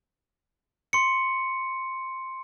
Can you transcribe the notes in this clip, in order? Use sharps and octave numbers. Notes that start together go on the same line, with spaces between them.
C6 C#7